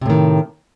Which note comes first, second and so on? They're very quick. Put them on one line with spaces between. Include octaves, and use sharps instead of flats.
C3 A2 D#3